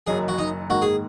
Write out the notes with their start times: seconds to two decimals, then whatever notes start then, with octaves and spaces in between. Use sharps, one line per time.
0.07 F#1 F#2 D#3 F#3 D#4 G#4
0.28 F#4
0.38 D#4
0.69 G#2 D#3 A#3 F#4
0.82 G#4